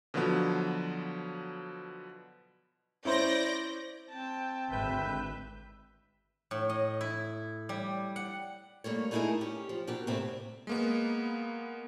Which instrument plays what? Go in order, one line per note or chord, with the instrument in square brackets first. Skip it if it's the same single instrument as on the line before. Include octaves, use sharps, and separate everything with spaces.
[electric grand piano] B2 D3 F3 F#3 B3
[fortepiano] C#4 E4 C5 [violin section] D5 G6 A#6
[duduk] C4 [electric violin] G5 A5
[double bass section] G#1 [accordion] D2 B4 G6 [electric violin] E5
[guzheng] A2
D#5
E4
G3
F#5
[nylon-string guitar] G3 A3 A#3 C#5
A3 B3 D#4 E4 G#4 A#4
C#4 G4
F3
B2 F#4 G4 A#4
A2 C3 C4 E5
[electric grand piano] G#3 A#3 B3